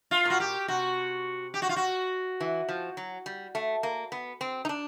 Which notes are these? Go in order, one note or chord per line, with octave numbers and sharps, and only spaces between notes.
F4
A#2 F#4
G4
C3 F#4
G4
F#4
F4
F#4
E3
F3
F#3
G3
A3
A#3
B3
C4
D#4
D4